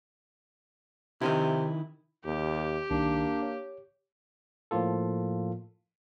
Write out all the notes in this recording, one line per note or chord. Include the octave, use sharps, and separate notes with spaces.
C3 D#3 D#4 E4
D#2 G4
C2 D#3 A#3 D4 D#4
C#5
A2 F3 A#3 F4 A4